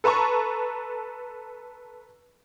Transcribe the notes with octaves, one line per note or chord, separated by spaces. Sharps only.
A4 B4 A5 A#5 C#6